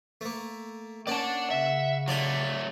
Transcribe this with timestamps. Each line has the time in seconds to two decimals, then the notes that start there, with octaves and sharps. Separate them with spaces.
0.21 A3 A#3
1.07 A#3 C#4 D5 F#5 A5
1.51 C#3 E5
2.08 F#3 A3 F4 D5 G#5